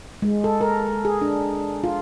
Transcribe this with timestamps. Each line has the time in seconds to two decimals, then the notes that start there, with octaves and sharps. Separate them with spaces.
0.22 G#3
0.44 A4
0.61 A#4
1.05 G#4
1.22 D4
1.84 F4